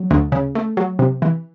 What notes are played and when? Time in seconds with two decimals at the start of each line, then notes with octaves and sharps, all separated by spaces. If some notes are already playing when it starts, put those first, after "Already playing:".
Already playing: F#3
0.11 D2
0.32 C#3
0.55 A3
0.77 F#3
0.99 C3
1.22 E3